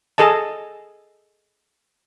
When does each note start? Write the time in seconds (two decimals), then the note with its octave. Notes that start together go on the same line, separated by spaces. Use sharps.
0.18 G#4 A4 D#5 A5